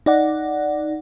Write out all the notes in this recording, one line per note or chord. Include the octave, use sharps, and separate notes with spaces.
D#4 D5 F#5